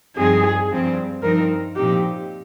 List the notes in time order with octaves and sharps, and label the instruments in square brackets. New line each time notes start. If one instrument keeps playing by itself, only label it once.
[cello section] G2 F3 C4 D#4 [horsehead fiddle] G#4
[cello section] G2 F3 C4
[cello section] G2 F3 C4 D#4 [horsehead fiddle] A#4
[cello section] A#2 F3 C4 D#4 [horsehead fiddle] G4